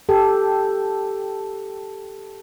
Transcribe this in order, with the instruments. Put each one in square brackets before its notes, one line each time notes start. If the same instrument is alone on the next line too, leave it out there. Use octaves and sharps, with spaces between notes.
[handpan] G4 A4